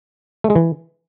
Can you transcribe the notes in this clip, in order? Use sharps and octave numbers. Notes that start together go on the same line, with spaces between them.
A3
G#3
E3